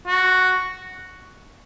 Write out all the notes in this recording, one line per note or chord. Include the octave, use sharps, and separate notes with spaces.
F#4